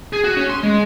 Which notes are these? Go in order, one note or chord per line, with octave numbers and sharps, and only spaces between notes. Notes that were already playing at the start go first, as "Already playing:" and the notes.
G#4
F#4
C#4
C6
G#3